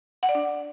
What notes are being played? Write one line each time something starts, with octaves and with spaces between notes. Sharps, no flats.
F#5
D5
D4